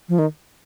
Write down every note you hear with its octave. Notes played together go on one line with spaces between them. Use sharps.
F3
D#3